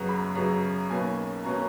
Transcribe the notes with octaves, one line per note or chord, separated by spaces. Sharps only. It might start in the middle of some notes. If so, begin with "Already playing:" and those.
Already playing: F#2 C#3 F#3 B3 A#5
B5
F#2 C#3 F#3 B3 A#5
B1 B2 A#3 C#4 G#5
B2 A#3 C#4 A#5